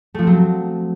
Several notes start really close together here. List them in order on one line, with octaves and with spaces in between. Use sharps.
A3 F3 C4 F#3